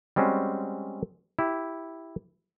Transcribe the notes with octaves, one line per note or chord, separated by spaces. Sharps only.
G3 G#3 C4 C#4 F#4
E4 G4